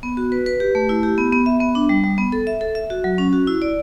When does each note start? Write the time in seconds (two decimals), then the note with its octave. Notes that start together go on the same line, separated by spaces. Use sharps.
0.03 B3
0.17 F#4
0.32 B4
0.46 B4
0.60 G4
0.75 A3
0.89 E4
1.03 G4
1.18 B3
1.33 B3
1.46 E5
1.61 B3
1.75 D4
1.89 G3
2.04 G3
2.18 B3
2.32 A4
2.47 E5
2.61 A4
2.75 E5
2.90 F#4
3.04 F#3
3.18 C#4
3.33 F#4
3.47 E4
3.62 D5